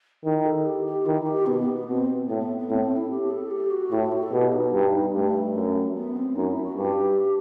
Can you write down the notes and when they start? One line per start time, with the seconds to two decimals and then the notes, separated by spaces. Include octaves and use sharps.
0.24 D#3 E4
0.46 A4
0.65 G4
0.86 G4
1.06 D#3 E4
1.26 G4
1.46 B2 B3
1.60 B3
1.74 B3
1.87 B2 C4
2.29 A2 B3
2.39 B3
2.59 B3
2.69 A2 C4
2.83 C4
2.97 E4
3.11 G4
3.31 A4
3.51 G4
3.71 F#4
3.91 A2 E4
4.01 E4
4.12 F#4
4.23 A4
4.32 B2 G4
4.52 D#4
4.73 G2
5.14 G2 A3
5.55 F#2
5.96 B3
6.16 C4
6.36 F#2 D#4
6.50 E4
6.64 F#4
6.77 G2 G4